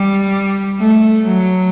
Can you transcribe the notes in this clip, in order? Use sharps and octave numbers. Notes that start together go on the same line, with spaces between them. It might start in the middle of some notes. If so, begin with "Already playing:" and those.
Already playing: G3
A3
F#3